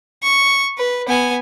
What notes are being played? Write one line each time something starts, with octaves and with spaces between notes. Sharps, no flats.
C#6
B4
B3 G#5